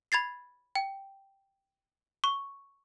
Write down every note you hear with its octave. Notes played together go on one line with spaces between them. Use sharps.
B5 G#6 A6 C7
G5
C#6